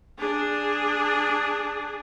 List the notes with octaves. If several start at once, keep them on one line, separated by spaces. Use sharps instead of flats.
D4 G#4